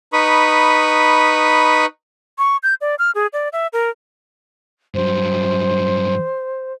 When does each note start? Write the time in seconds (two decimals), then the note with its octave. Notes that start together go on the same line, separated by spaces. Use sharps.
0.13 D#4 B4 B5 C#6 D#6
2.38 C#6
2.63 G6
2.81 D5
2.99 F6
3.15 G#4
3.33 D5
3.53 E5
3.73 A#4
4.95 G2 F#3 C5